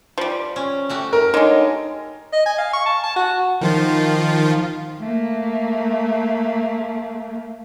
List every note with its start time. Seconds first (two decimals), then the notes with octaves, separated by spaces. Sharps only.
0.18 F3 G3
0.56 C#4
0.89 A3 F#4 G4
1.13 A#4
1.34 D3 G#3 D#4 C#5 D#5
2.33 D#5
2.46 G#5
2.58 F5
2.74 C#6
2.86 A5
3.03 A5
3.16 F#4
3.61 D#3 F3 F4
4.99 A3 A#3